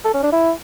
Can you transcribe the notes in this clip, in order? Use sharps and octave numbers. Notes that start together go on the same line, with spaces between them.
A4
C#4
D4
E4